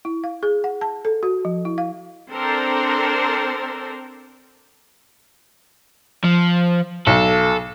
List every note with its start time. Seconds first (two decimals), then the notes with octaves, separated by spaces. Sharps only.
0.05 E4
0.24 F5
0.43 G#4
0.64 F#5
0.81 A5
1.05 A4
1.23 F#4
1.45 F3
1.65 E4
1.78 F5
2.31 C4 D4 A4 A#4 C5
6.24 F3
7.07 B1 A4